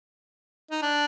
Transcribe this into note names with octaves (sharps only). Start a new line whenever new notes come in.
D#4
D4